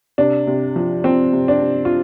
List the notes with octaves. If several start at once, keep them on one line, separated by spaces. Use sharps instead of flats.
C3 D4
C3
F3
F3 C4
C3
D4
C3
F4